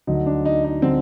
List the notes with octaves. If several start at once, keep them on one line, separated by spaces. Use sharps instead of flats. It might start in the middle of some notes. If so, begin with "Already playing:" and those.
D2 D3 F#3 D#4
D4
D#4
D#4
D3 F#3 C4